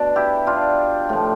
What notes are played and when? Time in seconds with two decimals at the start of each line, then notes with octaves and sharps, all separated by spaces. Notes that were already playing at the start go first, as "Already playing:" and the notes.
Already playing: B2 D4
0.16 E4 G4
0.47 D4 F4
1.09 A2 F3